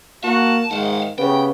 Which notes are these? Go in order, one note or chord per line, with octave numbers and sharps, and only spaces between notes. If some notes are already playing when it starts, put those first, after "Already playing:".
A#3 F#4 A5
G#2 D#3 F5 F#5
C#3 B3 G4 G5